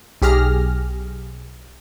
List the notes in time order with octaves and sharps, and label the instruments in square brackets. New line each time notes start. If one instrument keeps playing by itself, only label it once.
[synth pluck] B1 G4 G#4 F6 A#6